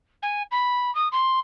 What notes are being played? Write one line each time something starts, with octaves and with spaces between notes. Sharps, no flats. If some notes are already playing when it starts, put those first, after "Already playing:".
G#5
B5
D#6
C6